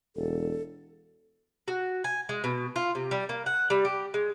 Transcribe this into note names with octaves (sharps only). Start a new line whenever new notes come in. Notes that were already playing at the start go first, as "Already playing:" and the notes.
E1 A4
F#4
G#5
G#3
B2
F4
C3
G3
A#3
F#5
G3
G4
G#3